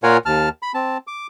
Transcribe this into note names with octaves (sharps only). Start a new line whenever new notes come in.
A#2 F4 A#4 C#5 F#5 G#5
D#2 A5 F6
B5
C4 A5
D6